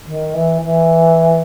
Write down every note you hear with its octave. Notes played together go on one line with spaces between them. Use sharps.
D#3
E3
E3